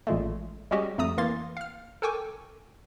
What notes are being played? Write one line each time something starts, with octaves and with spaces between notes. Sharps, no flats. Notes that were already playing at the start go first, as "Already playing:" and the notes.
A1 A#2 G#3 A3
G3 G#3 C#4 F#4 G4 D#5
F2 A3 A#5 D#6
E3 A#3 F5 C6 A6
F5 F6
A4 A#4 G5 G#5 C#6 D6